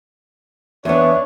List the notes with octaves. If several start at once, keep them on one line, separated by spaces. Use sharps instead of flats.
E2 B3 D4 C#5 E5